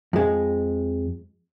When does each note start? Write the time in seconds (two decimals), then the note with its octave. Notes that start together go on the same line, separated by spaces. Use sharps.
0.13 F2 G#3